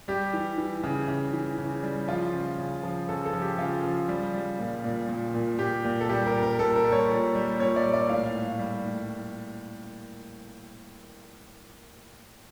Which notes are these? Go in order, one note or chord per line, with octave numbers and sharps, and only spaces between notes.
G3 G4
E3
E3
C#3
C#3
E3
C#3
G3
F3 F4
C#3
C#3
F3
C#3 A4
A4
F3
G4
C#3 F4
F3
G3
G3
A#2
A#2
A#2
A#2
A#2 G4
A#2
A4
G3 G4
A#4
A#2
A#4
A#2 A4
A#4
G3
C#5
A#2
G3
A#2 C#5
D5
G3
D5
A2 F5
A2
G3
A2